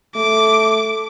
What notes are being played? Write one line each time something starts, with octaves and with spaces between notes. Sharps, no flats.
A3 D6